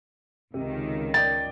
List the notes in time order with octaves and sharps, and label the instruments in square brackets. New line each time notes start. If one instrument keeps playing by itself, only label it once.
[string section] C#2 D#3 [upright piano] C3
[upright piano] D5 D#5 G5 [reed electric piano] A6